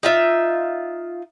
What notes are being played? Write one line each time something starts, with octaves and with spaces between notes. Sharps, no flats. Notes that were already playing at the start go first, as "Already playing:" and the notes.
D#4 F4 E5